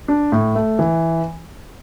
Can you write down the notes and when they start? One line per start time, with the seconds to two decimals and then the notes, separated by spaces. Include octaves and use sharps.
0.08 D4
0.32 A2
0.55 A3
0.79 E3